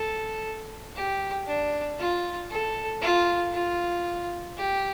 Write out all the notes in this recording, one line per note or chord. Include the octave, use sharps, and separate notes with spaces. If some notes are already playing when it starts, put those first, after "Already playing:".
Already playing: A4
G4
D4
F4
A4
F4
F4
G4